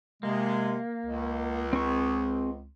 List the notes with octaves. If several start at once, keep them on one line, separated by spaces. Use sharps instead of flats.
C3 G#3 A#3
C#2
C4 G#4 C#6